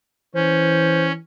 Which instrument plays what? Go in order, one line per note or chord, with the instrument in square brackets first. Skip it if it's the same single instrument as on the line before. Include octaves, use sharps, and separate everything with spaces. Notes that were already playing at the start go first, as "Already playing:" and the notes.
[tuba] E3 [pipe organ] C#4 [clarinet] C5